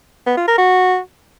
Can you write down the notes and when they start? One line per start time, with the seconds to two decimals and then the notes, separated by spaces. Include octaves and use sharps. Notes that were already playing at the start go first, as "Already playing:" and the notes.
0.27 B3
0.37 F4
0.48 A#4
0.58 F#4